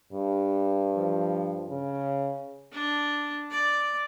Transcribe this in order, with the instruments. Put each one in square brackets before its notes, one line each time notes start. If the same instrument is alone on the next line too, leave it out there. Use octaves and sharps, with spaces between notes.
[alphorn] G2
[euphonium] F3
C#3
[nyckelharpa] D4
D5